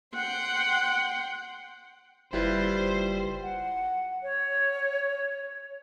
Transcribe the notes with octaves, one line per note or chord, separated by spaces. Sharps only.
F#5 G5 C6
F#1 G3 E4 F4 B4 C5
F#5
C#5